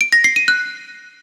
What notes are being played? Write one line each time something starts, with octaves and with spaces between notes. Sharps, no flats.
D7
A#6
C7
D#7
F#6